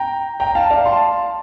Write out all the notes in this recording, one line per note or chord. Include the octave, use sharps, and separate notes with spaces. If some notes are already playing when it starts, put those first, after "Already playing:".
Already playing: G5 A#5
G5 A#5
F5 A5
D5 F5
A5 C6